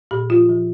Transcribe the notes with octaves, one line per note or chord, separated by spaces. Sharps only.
A#2 G4
F3 F4
F3